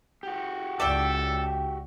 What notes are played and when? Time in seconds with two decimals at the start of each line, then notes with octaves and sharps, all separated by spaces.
0.23 F#4 G4
0.80 C#2 A4 D5 E5 G5